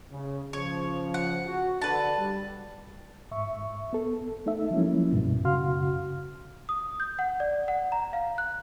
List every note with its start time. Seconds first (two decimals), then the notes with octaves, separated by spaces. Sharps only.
0.12 C#3
0.53 C#3 F3 C#5
1.14 F#5
1.46 F#4
1.82 D3 B4 A5
2.17 G3
3.31 G#2 E5 C#6
3.93 B3 A4
4.46 A3 D#4 A4 E5
4.70 F3 F#3 G#3 A#3 C#4 E4
5.12 C2 G2 B2
5.44 F#2 C#3 F#4 F5 C6 F6
6.69 D#6
7.00 G6
7.19 F#5
7.40 D5
7.68 F#5
7.92 A#5
8.13 F5
8.38 F#6